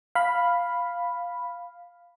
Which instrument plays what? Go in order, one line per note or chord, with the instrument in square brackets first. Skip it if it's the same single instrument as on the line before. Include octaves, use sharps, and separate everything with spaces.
[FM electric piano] F5 B5